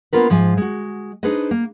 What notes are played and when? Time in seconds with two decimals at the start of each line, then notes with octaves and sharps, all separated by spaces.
0.13 A#3 B3 D4 F4 A#4 B4
0.30 G#2 F3 C5 E5 G#5
0.57 G#3 F#4
1.23 D4 D#4 G#4 B4 C5 D#5
1.51 A#3